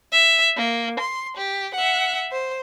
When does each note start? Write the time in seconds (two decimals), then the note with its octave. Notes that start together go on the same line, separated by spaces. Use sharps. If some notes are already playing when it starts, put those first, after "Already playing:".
0.13 E5
0.57 A#3
1.00 C6
1.37 G4
1.75 E5 F#5
2.32 C5